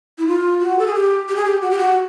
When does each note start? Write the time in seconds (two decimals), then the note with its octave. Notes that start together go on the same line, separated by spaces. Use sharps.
0.18 E4
0.27 F4
0.61 F#4
0.79 A4
0.87 G#4
0.95 G4
1.29 G4
1.36 G#4
1.45 G4
1.62 F#4
1.71 G4
1.79 F#4